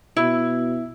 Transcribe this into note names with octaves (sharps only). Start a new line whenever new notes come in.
B2 E4